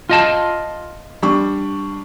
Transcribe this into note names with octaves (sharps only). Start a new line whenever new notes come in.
F4 D#5 A5
G3 D4 C#6